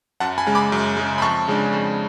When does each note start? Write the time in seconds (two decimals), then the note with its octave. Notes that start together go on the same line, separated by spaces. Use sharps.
0.20 F#2 F#5 A5
0.38 G#5 B5
0.47 C#3 G#3
0.55 B5 D6
0.72 F#2
0.97 C#3 G#3
1.18 B5
1.22 F2 A5 C#6
1.48 C#3 G#3 D4
1.73 F2